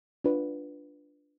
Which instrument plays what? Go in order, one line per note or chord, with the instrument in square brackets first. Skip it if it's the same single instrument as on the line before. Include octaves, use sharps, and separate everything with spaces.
[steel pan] D4 F4 B4